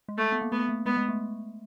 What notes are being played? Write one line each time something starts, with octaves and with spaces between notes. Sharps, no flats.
G#3
A3
B3
A#3
A3 B3
A3
G#3 B3
G#3
A3